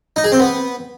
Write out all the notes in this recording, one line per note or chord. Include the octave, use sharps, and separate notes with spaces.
D#4
G#4
C4
B3